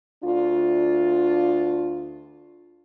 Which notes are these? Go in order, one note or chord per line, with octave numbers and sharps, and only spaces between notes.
D2 D4 F4